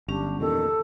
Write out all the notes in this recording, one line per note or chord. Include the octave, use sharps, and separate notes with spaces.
G1 F#3 C#4 D4 G4
E2 A#2 D#3 A4